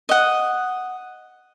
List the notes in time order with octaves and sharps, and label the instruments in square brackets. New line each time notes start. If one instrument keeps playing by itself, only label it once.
[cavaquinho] D#5 F#5